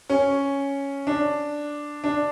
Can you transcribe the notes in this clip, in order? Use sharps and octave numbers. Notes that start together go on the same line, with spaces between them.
C#4
D4
D4